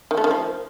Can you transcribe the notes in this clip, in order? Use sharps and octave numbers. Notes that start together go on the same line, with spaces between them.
D#3
A3
D#3
F3